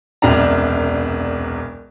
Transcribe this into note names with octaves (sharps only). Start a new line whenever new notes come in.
E1 C2 F#2 D4 A#5